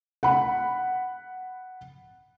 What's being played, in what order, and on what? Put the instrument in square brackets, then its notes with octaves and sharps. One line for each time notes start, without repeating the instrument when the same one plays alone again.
[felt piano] F#5 B5